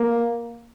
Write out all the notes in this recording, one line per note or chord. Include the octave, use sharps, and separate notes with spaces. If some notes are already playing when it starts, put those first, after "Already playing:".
Already playing: A#3